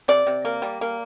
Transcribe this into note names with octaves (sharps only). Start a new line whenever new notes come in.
C3 D5
C3
A#3
G3
A#3